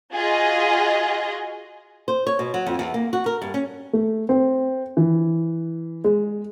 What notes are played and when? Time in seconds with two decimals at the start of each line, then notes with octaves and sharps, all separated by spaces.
0.14 F4 F#4 G#4 D#5
2.08 C5
2.27 C#5
2.39 B2
2.54 F#3
2.66 F2
2.79 E2
2.94 A#3
3.13 F#4
3.26 A#4
3.42 G2
3.54 C#4
3.93 A3
4.29 C4
4.97 E3
6.04 G#3